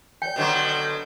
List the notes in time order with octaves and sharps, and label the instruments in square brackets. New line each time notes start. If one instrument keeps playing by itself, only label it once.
[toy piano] C#5 D5 G5 [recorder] G6
[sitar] B2 D3 F#3